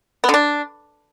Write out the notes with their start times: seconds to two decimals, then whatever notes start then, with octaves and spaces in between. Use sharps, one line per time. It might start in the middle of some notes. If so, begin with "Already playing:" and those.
0.24 B3
0.29 D3
0.34 D4